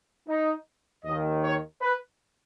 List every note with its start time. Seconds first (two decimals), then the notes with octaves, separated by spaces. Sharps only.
0.28 D#4
1.04 D#2 D#3 D#5
1.43 C#5
1.81 B4